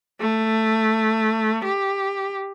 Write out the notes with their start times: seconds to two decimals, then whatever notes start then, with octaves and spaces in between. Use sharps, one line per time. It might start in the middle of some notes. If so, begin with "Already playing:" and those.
0.20 A3
1.64 G4